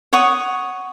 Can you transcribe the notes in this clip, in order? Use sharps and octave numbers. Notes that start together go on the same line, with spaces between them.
C#5 F#5 C#6 D#6